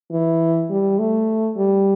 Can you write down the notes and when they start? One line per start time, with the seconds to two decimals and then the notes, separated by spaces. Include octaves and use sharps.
0.12 E3
0.70 G3
0.99 A3
1.57 G3